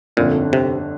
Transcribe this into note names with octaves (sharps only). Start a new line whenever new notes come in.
G1 F2 A#2 D3
C3